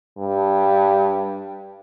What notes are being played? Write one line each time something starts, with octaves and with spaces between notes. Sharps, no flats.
G2